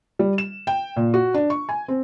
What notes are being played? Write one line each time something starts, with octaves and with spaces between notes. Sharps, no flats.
G3
E7
G5
A#2
F#4
D4
C#6
G#5
C4